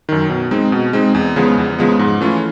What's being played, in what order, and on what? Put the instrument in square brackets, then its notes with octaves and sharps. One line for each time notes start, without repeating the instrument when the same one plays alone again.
[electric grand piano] F#2 D#3
B2
G#3 C4 D#4
B2
G#3 C4 D#4
E2
C#3 F3 G#3 B3
E2
C#3 F3 G#3 B3
G#2
E3 A3 C#4 F4